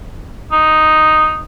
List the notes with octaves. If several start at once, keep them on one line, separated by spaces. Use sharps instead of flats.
D#4